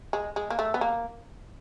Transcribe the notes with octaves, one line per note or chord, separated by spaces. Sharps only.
G#3
G#3
A#3
A3
B3
A#3